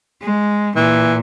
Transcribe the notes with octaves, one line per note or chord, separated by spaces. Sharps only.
G#3
A#2 E3